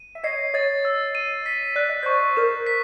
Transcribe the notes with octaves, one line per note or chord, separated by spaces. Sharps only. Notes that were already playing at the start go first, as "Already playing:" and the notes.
Already playing: D#7
E5
C#5 D#5 C7
C#5 D#5 A6
E6
D#7
B6
D5 F#6
D#5
C5 D5 C#6
A#4 C5 E7
B6